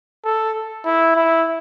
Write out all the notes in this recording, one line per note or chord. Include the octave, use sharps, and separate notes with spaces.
A4
E4
E4